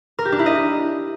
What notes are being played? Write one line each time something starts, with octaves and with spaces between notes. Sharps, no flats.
A#4
G4
D4
E4
D#5